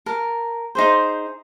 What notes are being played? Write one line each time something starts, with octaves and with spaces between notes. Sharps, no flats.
A#4 A5
D#4 G#4 C5